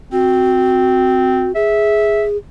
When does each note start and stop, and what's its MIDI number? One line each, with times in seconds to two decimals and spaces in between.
0.12 1.49 60
0.12 1.52 66
1.55 2.37 68
1.55 2.24 76